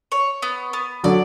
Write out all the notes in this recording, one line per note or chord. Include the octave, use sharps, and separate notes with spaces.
C#5
B3
B3
D3 F#3 D5